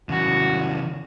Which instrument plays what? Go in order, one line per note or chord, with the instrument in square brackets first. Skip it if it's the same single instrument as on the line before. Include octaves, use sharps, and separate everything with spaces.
[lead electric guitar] C#3 E3 [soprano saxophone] F#4